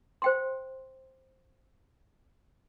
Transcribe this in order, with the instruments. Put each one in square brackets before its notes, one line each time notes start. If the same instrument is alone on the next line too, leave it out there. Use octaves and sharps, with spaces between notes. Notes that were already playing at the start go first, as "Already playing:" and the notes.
[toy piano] C5 G5 C6